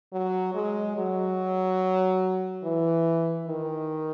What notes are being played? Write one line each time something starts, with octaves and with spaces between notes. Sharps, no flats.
F#3
G#3
F#3
E3
D#3